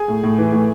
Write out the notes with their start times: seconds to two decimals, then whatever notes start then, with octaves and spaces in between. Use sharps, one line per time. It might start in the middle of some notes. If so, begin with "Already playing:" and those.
Already playing: G#4 G#5
0.08 A2
0.23 A2
0.38 E3
0.52 A2